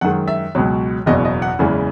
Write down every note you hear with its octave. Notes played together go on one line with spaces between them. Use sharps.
F#2 D#3 G#3 F#5
E5
C#2 B2 F#3
F#1 E2 B2 D#5
D#5
F#5
F#1 E2 C#3 E3 G#3